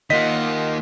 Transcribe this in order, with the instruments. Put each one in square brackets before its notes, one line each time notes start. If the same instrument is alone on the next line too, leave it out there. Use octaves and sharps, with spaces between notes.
[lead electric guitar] D#3 A#3 [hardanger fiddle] F4 F#5 [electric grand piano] D#5 B6